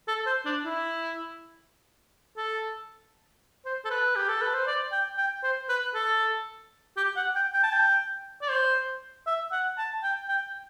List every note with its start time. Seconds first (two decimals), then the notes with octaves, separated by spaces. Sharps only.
0.08 A4
0.26 C5
0.45 D4
0.65 E4
2.37 A4
3.65 C5
3.85 A4
3.90 B4
4.16 G4
4.28 A4
4.41 B4
4.53 C5
4.67 D5
4.92 G5
5.17 G5
5.43 C5
5.69 B4
5.94 A4
6.97 G4
7.16 F#5
7.35 G5
7.54 G5
7.63 A5
7.72 G5
8.42 D5
8.50 C5
9.26 E5
9.52 F#5
9.78 A5
10.03 G5
10.28 G5